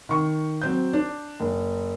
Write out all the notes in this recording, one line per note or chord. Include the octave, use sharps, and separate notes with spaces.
D#3 C#6
F#3 C4 G6
D4
F#1